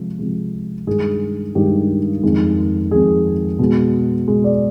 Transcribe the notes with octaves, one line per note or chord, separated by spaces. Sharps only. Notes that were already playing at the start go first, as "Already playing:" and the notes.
Already playing: C3 F3 G#3
C3 F3 G#3
G2 D#3 G#3 G#4
G2 D#3 G#3 G4
F2 D#3 G#3
F2 D#3 G#3 G#4
B2 G#3
B2 G#3
D5